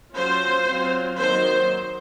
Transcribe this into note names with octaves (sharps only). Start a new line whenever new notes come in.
F#3 C#4 F4 C5
F#3 C4 F4
D#3 F#3 A#3 D#4 C5